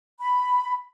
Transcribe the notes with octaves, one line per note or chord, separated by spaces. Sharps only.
B5